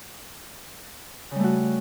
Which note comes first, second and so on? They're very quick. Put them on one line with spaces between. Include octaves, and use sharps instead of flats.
C#3 G3 A3 F#4